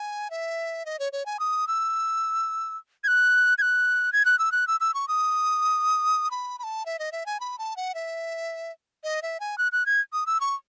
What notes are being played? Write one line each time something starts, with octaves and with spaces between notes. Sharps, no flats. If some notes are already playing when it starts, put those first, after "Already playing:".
Already playing: G#5
E5
D#5
C#5
C#5
G#5
D#6
E6
G#6
F#6
G#6
F#6
G#6
F#6
E6
F#6
E6
E6
C#6
D#6
B5
B5
A5
E5
D#5
E5
G#5
B5
A5
F#5
E5
D#5
E5
G#5
F#6
F#6
G#6
D#6
E6
C#6